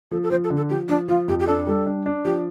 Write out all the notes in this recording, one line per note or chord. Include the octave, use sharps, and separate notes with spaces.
F3 A4
A4
F3 C5
A4
D3
A4
F3 G4
F3 D4
F3 F4
F2 G4
G4
D4 A4
G3 A4
D4
D4
F3 G4